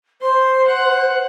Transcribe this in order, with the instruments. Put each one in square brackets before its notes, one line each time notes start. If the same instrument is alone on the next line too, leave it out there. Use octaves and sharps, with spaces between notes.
[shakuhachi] C5 [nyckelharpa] C6
[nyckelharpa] F#5